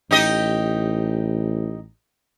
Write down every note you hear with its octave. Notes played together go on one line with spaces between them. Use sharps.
A1 D#4 G4 D#5